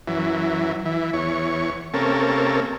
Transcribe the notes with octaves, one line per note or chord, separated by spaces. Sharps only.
F#2 E3
E3
E2 C#5
C3 A#3 C#4 A4